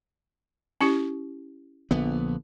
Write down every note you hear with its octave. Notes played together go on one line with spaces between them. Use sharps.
C#4 E4 G4
A#1 D3 B3